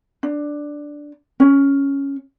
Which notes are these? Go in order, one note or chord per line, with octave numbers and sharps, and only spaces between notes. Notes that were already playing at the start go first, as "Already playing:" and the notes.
D4
C#4